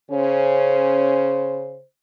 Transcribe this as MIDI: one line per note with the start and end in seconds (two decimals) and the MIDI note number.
0.11 1.82 49
0.11 1.82 61
0.11 1.82 72